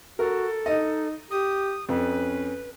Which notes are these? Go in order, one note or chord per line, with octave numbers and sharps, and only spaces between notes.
F#4 A4 A#4
D#4 D#5
G4 D#6
F2 C#4 B4